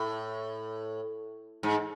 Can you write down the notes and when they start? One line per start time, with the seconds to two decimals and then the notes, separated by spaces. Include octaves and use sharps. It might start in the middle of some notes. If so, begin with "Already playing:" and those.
Already playing: A2
1.63 G#2